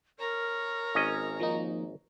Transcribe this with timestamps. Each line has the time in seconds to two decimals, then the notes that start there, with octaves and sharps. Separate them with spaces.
0.19 A#4 C#5 A#5
0.95 G#1 C#4 D#5
1.40 F3 A#3 D#4